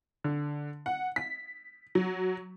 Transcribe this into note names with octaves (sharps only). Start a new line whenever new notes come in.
D3
F#5
B6
F#3